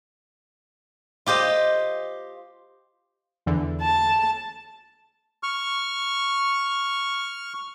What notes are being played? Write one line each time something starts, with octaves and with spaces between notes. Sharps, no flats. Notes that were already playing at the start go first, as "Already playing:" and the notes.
F4 G4 C5 D#5
E2 D3 E3
A5
C#6 F6